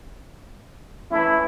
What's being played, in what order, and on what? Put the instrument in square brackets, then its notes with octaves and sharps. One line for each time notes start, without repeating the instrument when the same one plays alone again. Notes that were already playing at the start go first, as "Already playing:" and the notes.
[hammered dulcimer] E3 A3 C#4 [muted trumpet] E4